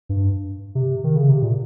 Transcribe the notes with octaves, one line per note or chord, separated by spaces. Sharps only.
G2
C3
D#3
C#3
C3
A#2